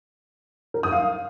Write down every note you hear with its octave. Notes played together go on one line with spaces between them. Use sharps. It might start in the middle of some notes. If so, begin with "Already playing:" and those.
A#4
D#6
F5